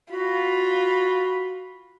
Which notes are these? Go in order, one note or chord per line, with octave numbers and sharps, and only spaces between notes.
F4 F#4 B5